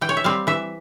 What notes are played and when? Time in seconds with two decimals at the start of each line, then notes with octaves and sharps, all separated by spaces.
0.01 E3 G5
0.09 C#5
0.17 E5
0.24 G3 C4 F5
0.47 E3 E5